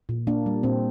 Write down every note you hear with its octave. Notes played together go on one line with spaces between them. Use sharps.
A#2
A#3 D4
G3
A#2 C4